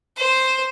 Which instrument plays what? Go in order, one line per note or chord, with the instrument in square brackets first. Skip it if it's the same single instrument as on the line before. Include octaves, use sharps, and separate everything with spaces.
[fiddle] C5